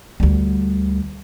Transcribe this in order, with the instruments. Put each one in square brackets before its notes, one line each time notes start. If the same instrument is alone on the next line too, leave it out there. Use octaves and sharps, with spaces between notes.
[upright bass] D2 G3